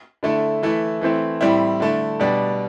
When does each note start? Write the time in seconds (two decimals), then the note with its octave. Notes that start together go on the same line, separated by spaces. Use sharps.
0.23 D3 A3 E4
0.63 E3 A3 E4
1.01 E3 A3 C4 E4
1.41 A2 G3 C4 E4
1.80 D3 A3 E4
2.20 B2 G3 D4